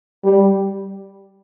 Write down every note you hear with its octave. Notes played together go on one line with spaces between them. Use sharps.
G3